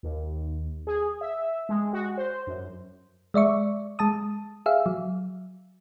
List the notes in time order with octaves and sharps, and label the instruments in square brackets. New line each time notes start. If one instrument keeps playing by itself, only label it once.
[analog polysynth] D#2
G#4
E5
G#3
F#4
C5
F#2
[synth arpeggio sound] G#3 D5 E5 C#6
G#3 A5 D#6
G#4 E5 F5
F#3